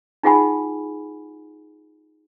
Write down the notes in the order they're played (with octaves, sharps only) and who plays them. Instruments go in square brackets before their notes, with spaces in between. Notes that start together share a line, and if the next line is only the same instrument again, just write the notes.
[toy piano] D#4 F4 G#4 F#5 G#5 B5